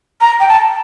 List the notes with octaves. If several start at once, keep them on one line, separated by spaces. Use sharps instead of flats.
A#5
G5
A5